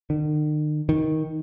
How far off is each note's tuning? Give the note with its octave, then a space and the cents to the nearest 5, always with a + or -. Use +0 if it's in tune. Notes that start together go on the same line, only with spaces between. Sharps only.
D#3 -45
D#3 +10